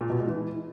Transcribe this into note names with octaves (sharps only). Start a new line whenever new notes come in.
A#2
B2
G#3
E3